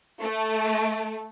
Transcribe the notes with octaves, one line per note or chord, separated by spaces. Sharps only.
A3